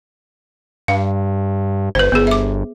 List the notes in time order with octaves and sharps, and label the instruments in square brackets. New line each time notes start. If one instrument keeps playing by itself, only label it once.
[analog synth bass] G2 [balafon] F5
[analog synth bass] G1 [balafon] B4 C5
[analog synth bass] G1 [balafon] B3 G#4
[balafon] E5 D6